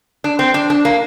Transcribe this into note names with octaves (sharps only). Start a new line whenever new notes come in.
D4
C4
D4
D4
A#3